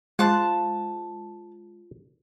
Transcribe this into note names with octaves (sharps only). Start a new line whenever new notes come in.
G#3 F4 C5 A5 F#6